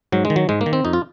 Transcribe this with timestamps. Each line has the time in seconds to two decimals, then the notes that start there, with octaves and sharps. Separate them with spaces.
0.12 G#2 F#3
0.25 G#3
0.30 D#3
0.36 F#3
0.49 G#2 G#3
0.61 A#3
0.66 D#3
0.73 C4
0.84 F2 D#4
0.93 F4